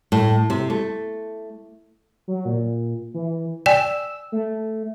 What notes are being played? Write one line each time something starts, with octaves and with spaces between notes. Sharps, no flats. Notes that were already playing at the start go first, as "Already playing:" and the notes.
A2
C3
A3
F#3
A#2
E3
D5 G5 G#5 E6
A3